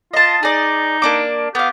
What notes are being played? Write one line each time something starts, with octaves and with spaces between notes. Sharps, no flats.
F4 D#5 A5
D#4 G#4 D5
A#3 D4 D6
B3 G4 F5